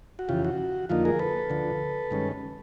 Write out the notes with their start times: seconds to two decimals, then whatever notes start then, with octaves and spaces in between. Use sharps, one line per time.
0.19 F#4
0.29 F2 C#3 E3 F4 G4
0.45 F#4
0.89 F2 D3 F3 A#3 D#4 F4
1.05 G#4 A#4
1.19 A4 B4
1.50 D2 D3 F3
2.11 G2 D#3 G#3 C#4